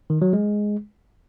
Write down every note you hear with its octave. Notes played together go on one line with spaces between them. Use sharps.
D#3
F#3
G#3